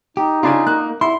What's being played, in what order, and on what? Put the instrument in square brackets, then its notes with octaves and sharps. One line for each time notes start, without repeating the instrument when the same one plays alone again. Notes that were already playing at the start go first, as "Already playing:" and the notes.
[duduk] D#4 [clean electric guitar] G4
[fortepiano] C#3 D4 G#5 [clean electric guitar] F4
[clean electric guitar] A#3 [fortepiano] F#6
[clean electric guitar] E4 [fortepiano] C6